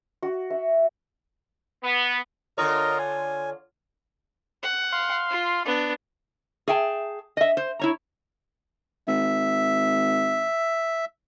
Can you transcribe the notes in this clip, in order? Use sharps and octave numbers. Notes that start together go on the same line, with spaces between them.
F#4
E5
B3
D3 F4 A#4 C#5 D#5
G#5
F#5
F5 C6
F4
B3 D4
G#4 E5 G5 A5
D#5 E5
C5
E4 C#5 A#5
G#1 E5